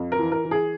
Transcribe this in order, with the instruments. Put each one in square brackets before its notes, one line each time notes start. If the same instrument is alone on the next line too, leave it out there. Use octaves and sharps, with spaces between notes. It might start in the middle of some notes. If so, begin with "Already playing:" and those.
Already playing: [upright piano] F2
A#4
E3
A#4
E3
G#4